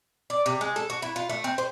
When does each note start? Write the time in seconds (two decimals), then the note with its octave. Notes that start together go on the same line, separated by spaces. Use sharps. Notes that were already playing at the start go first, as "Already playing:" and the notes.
0.30 D5
0.46 C3
0.61 G#3
0.76 A4
0.90 F#4
1.02 E4
1.16 F4
1.29 A3
1.44 C4
1.58 C5